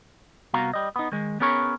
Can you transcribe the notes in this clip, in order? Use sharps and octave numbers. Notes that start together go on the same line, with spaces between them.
C2 B3 F#4 F5 A#5
G3 D#5
B3 D#4
D#3 G#3
B3 C#4 G#4 A#4 B4 C#5